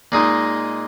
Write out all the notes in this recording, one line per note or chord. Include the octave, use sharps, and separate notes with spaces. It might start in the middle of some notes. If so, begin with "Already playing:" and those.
A#2 G#3 D#4